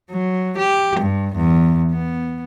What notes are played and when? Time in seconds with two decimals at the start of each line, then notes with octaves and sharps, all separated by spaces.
0.10 F#3
0.58 G4
1.00 G2
1.36 E2
1.91 B3